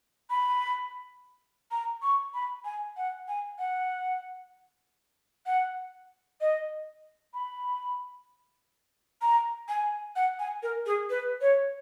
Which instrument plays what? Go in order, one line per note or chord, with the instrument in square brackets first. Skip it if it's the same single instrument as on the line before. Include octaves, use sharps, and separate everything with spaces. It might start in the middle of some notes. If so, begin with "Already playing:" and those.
[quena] B5
A#5
C#6
B5
G#5
F#5
G#5
F#5
F#5
D#5
B5
A#5
G#5
F#5
G#5
A#4
G#4
B4
C#5